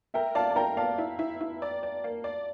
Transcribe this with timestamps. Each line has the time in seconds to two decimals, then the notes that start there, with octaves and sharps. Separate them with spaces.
0.14 A#4 E5 G5
0.35 D5 F5 A5
0.51 A5
0.56 A#4 G5 A#5
0.77 D5 F5 A5
0.98 E4
1.19 E4
1.41 E4
1.62 D5
1.83 D5
2.04 A#3
2.24 D5